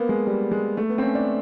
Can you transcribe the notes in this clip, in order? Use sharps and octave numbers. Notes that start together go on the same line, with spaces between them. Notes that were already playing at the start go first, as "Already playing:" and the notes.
Already playing: A#3 B3
G#3
G3
G#3
A3
B3
C4
C#4
D4